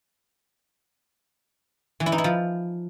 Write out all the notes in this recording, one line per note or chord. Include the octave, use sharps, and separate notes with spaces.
E3
E4
D#4
E4
F3